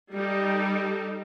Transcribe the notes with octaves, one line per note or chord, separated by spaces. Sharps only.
G3 D#4 A4